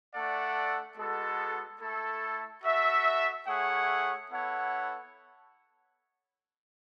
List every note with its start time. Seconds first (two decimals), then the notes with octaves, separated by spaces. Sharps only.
0.13 A3 D4 A4 D5 F#5
0.96 G#3 B3 F#4 A4
1.80 A3 E4 A4
2.64 F#4 A4 E5
3.46 A3 E4 G#4 C#5 F#5
4.31 B3 E4 A4 C#5 F#5